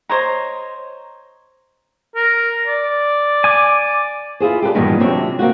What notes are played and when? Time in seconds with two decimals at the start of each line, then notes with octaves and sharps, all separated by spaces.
0.09 C5 C#5 D#5 A#5
2.16 A#4
2.67 D5
3.44 G#5 D6
4.40 E4 F4 G#4 C5
4.62 G4 A4 B4 D5
4.75 E2 G2 A#2 D#3
5.00 F#2 C3 C4 D4 C#5
5.39 F3 A#3 C4 F#4